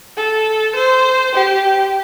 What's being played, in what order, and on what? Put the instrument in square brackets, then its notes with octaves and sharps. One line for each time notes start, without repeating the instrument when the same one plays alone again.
[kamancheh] A4
C5
G4